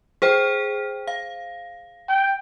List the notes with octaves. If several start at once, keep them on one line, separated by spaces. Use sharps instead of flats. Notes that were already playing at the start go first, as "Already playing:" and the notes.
G#4 C5 G5
F5
G5